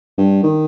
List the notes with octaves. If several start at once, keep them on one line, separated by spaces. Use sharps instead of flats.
G2
D#3